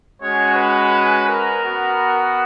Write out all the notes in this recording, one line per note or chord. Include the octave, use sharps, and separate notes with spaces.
G#3 C#4 F#4 C#5
B4
A#4
B3 F#4